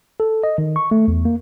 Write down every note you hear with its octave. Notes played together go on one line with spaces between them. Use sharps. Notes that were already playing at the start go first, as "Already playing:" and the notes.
A4
D#5
D#3
C#6
A3
E2
A#3